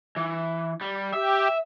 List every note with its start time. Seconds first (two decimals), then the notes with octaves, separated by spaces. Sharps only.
0.16 E3
0.81 G3
1.14 G4 E5